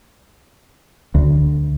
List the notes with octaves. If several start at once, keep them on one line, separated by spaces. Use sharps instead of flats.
D2